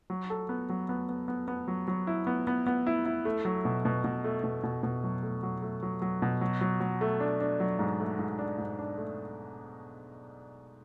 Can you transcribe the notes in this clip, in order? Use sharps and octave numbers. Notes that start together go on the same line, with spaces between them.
F#3
A4
B3
F#3
B3
B3
B3
B3
F#3
F#3
E4
B3
B3
B3
E4
E4
A3
F#3
B2
B2
B2
A3
B2
B2
B2
F#3
A3
F#3
A3
F#3
F#3
B2
F#3
F#3
F#3
A3
D4
D4
F#3
G#2
A3
G#2
D4
G#2
D4
A3